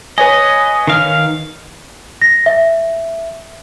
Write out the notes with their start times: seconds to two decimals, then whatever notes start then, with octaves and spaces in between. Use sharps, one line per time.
0.18 B4 C#5 D#5 G#5
0.87 D#3 F5 F6
2.22 A#6
2.46 E5